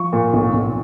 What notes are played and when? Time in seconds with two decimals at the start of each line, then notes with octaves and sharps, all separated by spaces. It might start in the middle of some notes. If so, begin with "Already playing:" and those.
Already playing: F3 C#6
0.13 A#2
0.33 B1
0.53 B1